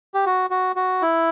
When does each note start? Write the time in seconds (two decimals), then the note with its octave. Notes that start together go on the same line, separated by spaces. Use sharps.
0.14 G4
0.26 F#4
0.50 F#4
0.76 F#4
1.02 E4